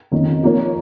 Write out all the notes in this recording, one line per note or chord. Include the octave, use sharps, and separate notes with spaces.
F2 D#3 A#3 C#4
F3 A#3 D#4 A#4 C#5